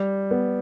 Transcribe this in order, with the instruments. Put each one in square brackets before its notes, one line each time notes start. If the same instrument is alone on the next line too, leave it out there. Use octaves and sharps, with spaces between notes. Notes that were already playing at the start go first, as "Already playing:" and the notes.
Already playing: [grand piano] G3
B3